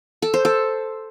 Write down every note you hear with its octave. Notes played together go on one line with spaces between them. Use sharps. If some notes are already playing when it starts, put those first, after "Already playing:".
A4
C5
A4